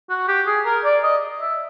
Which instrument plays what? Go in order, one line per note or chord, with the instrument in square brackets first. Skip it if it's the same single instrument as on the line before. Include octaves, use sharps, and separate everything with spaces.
[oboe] F#4
G4
G#4
A#4
D5
D#5
E5